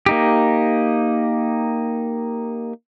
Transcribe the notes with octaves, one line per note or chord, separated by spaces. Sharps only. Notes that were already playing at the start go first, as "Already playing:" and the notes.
A#3 D#4 G4